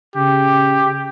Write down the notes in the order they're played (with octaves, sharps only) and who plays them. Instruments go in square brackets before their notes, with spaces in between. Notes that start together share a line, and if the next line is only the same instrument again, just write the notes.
[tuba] C#3 [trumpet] G4